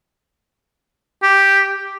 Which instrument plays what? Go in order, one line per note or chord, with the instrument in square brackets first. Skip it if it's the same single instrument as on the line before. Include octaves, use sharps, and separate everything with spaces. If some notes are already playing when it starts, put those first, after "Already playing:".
[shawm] G4